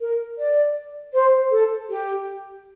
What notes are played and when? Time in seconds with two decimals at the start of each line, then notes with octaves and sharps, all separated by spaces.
0.01 A#4
0.39 D5
1.14 C5
1.51 A4
1.89 G4